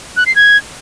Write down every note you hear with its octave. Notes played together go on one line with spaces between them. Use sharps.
F#6
C7
G#6